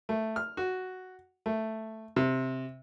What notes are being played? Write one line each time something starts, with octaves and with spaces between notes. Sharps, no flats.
A3
F6
F#4
A3
C3